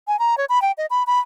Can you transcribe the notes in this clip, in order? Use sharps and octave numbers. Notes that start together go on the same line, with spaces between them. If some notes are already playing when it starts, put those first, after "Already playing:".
G#5
A#5
C#5
B5
G5
D#5
B5
B5